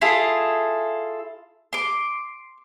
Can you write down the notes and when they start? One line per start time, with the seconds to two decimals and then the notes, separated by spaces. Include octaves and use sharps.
0.01 E4 F4 G#4 A4
1.73 C6 D6